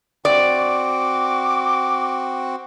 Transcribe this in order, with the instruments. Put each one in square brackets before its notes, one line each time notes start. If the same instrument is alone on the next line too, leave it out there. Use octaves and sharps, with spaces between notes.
[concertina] C4 F#4 [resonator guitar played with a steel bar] D5
[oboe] D6